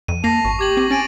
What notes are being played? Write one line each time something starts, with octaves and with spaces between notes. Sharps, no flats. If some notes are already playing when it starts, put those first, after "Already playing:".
F2 D#7
A#3 A5 A#6 C7 F7
G#1 C#6
G4 D6 G#6 F#7
C4
C#4 G#5 A6 D7 D#7